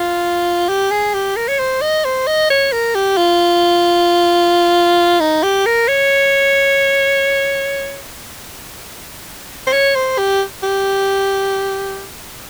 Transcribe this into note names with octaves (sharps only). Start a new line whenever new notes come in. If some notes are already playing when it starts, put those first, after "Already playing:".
Already playing: F4
G4
G#4
G4
A#4
C#5
C5
D#5
C5
D#5
C#5
A#4
G4
F4
D#4
G4
A#4
C#5
C5
C#5
C5
G4
G4